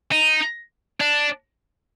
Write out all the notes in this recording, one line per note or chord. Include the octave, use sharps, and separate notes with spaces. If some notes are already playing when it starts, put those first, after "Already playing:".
D#4
D4